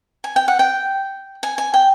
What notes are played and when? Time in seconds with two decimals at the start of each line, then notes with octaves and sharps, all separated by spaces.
0.24 G#5
0.36 G5
0.48 F#5
0.59 G5
1.43 G#5
1.58 G#5
1.74 G5